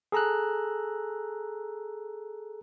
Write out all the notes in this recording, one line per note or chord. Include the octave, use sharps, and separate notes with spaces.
G#4 A4 A#5 E6 F#6